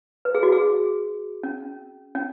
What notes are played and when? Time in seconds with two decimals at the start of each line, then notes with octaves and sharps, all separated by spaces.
0.25 B4
0.35 G#4
0.43 F#4
0.52 G#4
1.43 C#4
2.15 C#4